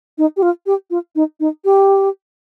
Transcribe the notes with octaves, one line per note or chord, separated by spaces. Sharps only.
D#4
G4
F4
G4
F4
D#4
D#4
G4